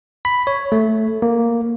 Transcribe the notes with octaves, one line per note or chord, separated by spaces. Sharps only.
B5
C#5
A3
A#3